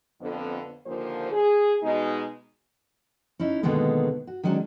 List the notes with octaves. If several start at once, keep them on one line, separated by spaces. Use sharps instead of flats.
F2 D3 B3
D#2 A#2 D3 F3 A#3 C5
G#4
B2 G#3 D#4
C#4 D#4 E4
B2 D3 D#3 G#3 A#3 B3
F#4
D#3 F#3 G#3 C#4 D4